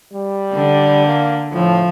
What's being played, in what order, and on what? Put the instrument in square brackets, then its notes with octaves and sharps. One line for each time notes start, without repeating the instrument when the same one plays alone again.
[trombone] G3
[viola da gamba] D3
[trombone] A#3
[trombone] A2 [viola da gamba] F3